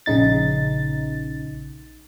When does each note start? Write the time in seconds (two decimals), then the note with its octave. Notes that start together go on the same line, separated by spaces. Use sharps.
0.06 A#1 C#3 D#4 A6